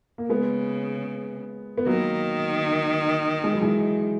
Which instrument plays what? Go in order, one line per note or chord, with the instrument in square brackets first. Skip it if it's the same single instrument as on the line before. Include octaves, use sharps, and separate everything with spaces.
[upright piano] A#3
[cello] C#3 [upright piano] G#3 B3
[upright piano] B3
[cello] D#3 [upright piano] F#3 A#3
[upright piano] G#3
F#3
E3 G#3